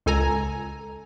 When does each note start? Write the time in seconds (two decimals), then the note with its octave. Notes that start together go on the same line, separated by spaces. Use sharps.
0.06 C#2 A4 G#5 A#5 G#6